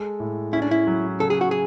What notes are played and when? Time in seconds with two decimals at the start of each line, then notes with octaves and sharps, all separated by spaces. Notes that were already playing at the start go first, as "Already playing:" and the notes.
Already playing: G#3 A4
0.20 A2
0.53 C#4 E4
0.62 D4
0.71 E4
0.87 F#3
1.20 C#3 A4
1.30 G#4
1.41 F#4
1.51 G#4